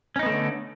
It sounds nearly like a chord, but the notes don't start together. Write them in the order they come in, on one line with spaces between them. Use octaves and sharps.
C#4 D#4 B3 A3 D3